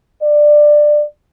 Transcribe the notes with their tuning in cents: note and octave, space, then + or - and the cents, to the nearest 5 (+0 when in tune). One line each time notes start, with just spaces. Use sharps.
D5 +15